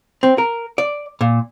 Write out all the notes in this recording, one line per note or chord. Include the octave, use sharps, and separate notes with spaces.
C4
A#4
D5
A#2